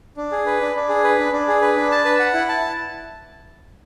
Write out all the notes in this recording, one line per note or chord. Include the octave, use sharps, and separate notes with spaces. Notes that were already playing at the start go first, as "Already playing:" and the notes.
D4
G#4
B4
D4
D4
G#4
B4
D4
D4
G#4
B4
D4
A5
B4
F#5
E4
A5